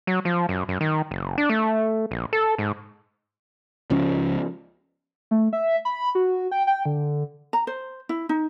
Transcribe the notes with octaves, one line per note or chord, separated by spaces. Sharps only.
F#3
F3
F#2
F#2
D#3
F#1
D4
A3
A#1
A4
G#2
C#2 F3 C#4
A3
E5
B5
F#4
G5
G5
D3
A#5
C5
E4
D#4